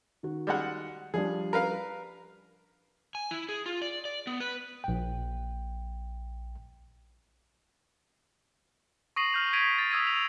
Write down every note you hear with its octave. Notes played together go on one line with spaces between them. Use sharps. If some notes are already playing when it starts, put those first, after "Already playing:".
D#3 F#4
G3 G#3 F#5
F3 G3 D4 G#4
A#4 B4 F5
G#5
E4
G#4
F4
D5
D5
B3
B4
A#1 G5
C#6 D#6 A#6 C7 D#7 F#7
F6 G6 F7
G#6 B6 D7 D#7 F7
A6
D#6 E6 G#6 B6 D#7
F7